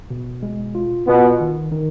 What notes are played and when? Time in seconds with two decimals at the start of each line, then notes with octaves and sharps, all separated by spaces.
0.10 B2
0.43 G#3
0.75 F4
1.07 B2 B3 F4
1.40 D#3
1.72 D#3